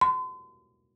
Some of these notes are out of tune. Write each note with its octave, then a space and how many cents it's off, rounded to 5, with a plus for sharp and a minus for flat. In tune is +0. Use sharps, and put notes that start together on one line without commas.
C6 -40